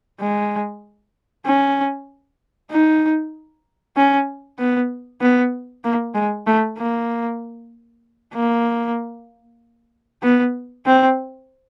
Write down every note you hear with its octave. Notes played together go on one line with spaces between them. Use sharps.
G#3
C#4
D#4
C#4
B3
B3
A#3
G#3
A3
A#3
A#3
B3
C4